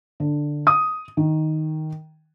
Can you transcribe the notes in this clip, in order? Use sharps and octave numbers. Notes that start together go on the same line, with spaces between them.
D3
D#6
D#3